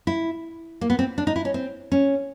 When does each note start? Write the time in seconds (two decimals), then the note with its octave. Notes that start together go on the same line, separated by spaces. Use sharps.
0.07 E4
0.81 A#3
0.90 B3
0.99 C4
1.18 D4
1.27 D#4
1.36 E4
1.45 C#4
1.54 C4
1.92 C#4